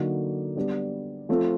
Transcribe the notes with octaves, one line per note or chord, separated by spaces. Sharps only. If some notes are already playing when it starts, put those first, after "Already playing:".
Already playing: D3 F#3 A#3 D#4 F#4
G3 B3 D4 G4
F3 A3 C4 F4